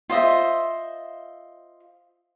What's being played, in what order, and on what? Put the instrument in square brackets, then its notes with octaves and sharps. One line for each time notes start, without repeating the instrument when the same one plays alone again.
[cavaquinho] F4 C5 D#5 E5